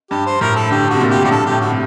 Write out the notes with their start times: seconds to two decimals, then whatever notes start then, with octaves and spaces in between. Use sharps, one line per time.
0.11 G2 G4
0.26 C5
0.41 A2 A#4
0.56 A4
0.71 D3 G4
0.90 C3 F#4
1.01 A#2
1.11 G4
1.24 A2 G4
1.31 G2 A4
1.46 G4
1.51 A2
1.61 F#4
1.71 C3